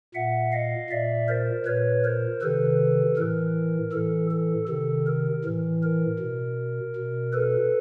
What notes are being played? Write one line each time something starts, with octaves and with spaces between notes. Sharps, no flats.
A#2 E5 F#5
D#5 F5
A#2 D5 E5
A#4 C5
A#2 B4 C#5
A#4 C5
C3 D#3 A4 B4
A2 E3 A#4
A2 E3 A4
A4
C3 D#3 A4
A#4
A2 E3
A#4
B2
B2
A4 B4